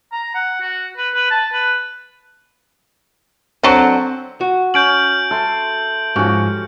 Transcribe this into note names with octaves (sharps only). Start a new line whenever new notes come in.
A#5
F#5
F#4
B4
B4
A5
B4
D3 F#3 C4 F#5
F#4
C#4 G6 D7 F#7
A4 E5 C6
G#2 F3 C#4 F#4 G4